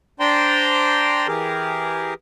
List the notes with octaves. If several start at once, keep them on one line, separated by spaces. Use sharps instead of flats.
D4 C5 D5 G5 A#5 C6
E3 G4 G#4 A#4